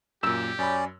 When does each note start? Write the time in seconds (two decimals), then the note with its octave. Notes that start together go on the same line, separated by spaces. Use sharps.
0.23 F#2 A#2 G4 E6
0.59 F#2 C#4 D5 B5